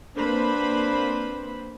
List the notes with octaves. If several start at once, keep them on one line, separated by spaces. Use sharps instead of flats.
A#3 C4 D4 B4 C5 B5